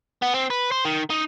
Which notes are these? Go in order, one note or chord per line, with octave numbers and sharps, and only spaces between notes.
B3
C4
B4
C5
D#3
D#4